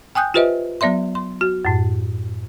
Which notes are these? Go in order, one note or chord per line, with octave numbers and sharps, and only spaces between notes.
G5 G#5 D#6 F#6 G6
F4 G4 B4 C5 D#5 E5
F#3 B3 D5 E5 C6
C6
F#4
F#2 A2